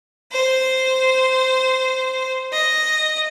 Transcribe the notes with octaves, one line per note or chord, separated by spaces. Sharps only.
C5
D#5